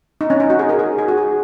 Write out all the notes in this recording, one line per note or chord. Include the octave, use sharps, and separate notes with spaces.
D#4
C#4
D#4
F#4
G#4
A#4
G#4
G#4
F#4
G#4